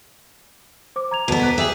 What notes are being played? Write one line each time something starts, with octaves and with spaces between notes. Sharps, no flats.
C5 D6
A#5 G#6 F7
D2 B2 B3
F#6 B6
G4 G#4 E5